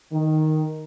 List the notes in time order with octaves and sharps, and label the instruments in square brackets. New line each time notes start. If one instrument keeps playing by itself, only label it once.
[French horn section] D#3